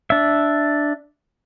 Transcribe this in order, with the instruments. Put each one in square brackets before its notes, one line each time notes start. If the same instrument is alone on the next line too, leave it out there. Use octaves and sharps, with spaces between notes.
[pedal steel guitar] D4 E5